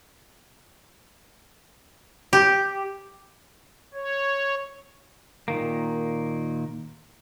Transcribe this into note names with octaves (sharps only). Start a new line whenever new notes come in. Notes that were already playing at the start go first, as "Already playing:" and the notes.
G4
C#5
A#2 D#3 A#3